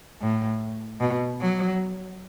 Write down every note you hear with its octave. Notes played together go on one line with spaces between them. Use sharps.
A2
B2
F#3